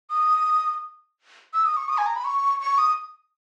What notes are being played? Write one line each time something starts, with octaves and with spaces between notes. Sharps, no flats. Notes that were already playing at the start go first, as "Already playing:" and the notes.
D#6
E6
D#6
C#6
D#6
G#5
A#5
B5
C#6
C#6
D#6